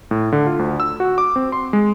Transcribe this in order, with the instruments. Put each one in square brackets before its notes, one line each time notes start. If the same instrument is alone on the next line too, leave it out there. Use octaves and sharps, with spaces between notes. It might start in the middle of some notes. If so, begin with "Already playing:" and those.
[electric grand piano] A2
D3
F4
D2
E6
F#4
D6
C4
C6
G#3